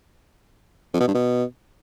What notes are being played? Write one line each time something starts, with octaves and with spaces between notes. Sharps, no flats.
F2
B2
G2
B2